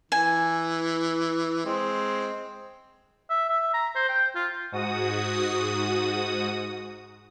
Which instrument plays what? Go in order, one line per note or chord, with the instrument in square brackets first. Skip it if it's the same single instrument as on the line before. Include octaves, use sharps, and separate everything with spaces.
[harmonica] E3 [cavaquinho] G#5
[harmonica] G#3 C4
[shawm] E5
E5
A#5
C5
G5
F4
[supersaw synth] G#2 F#4 D#6